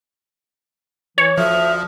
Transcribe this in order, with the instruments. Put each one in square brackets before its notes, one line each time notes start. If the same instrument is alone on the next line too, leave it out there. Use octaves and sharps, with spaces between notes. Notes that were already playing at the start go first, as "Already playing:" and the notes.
[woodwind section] E3 [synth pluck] C#5
[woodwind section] D2 D#6 F6 [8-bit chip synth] F3 [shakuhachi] E5